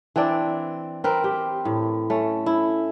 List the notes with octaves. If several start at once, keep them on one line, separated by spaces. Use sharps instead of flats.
E3 C4 D4 D5
C4 A#4 B4
G4
A2
A3 C#4
E4